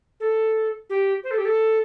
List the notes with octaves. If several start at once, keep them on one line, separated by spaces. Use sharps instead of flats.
A4
G4
C5
A4
G4
A4